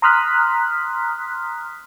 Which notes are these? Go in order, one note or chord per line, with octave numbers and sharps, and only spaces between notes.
A#5 C6 D#6 F6 F#6 B6